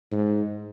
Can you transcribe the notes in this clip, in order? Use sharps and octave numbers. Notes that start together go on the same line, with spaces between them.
G#2